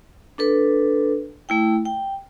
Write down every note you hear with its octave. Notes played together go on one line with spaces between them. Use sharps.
D4 A4 B4
A3 E4 G5
G5